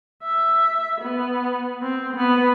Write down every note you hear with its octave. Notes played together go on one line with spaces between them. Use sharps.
E5
B3
C4
B3